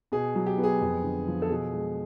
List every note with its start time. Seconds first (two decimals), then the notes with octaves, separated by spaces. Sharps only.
0.12 B2 G#4
0.35 F#3
0.46 G4
0.58 B3
0.63 G#4
0.81 F2
1.04 D3
1.28 F3
1.42 A4
1.50 B2 G#4
1.73 G#3